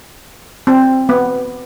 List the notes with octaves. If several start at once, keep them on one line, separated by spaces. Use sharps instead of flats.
C4
B3